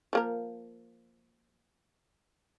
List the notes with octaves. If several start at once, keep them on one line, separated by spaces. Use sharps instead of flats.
F3 A#3 A#4